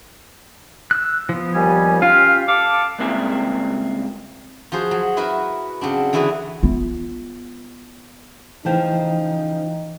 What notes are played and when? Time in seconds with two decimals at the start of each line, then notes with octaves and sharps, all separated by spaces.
0.91 E6 F#6
1.29 F3 B3
1.55 D#2 G3 G#5
2.02 C#4 F4 G4 F5
2.48 A4 F5 D6
2.99 C#2 G2 A#3 C4 E4 G#4
4.72 F3 F#4 G#4 C5
4.91 F#3
5.17 E4 F#4 A#4 B4 E5
5.81 C#3 F#3 C4 D4
6.13 D3 E3 E4 F#4 G#4 B4
6.63 B3 F4
8.65 C#3 E3 F3 A3 D#4 G5